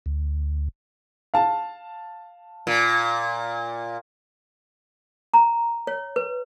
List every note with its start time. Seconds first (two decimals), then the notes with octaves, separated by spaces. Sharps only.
0.06 D2
1.34 F5 A5
2.67 A#2
5.34 A#5
5.87 C#5
6.16 B4